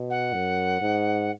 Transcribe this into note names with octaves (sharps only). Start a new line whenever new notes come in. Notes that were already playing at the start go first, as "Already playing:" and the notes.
Already playing: B2
F#5
F#2
G#2